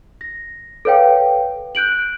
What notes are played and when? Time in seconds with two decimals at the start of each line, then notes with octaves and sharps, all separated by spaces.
0.21 A#6
0.85 A4 B4 C#5 F5 G5
1.75 F#6 G6 D7 F#7